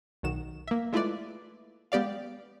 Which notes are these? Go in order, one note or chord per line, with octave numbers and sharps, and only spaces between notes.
B1 D#3 F#4 E7
A#3 E5
G#3 A3 E4 F4 B4 D5
G#3 B3 G4 D5 F5